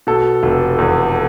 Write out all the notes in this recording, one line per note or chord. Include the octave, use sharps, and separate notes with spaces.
B2 A4
F1
E2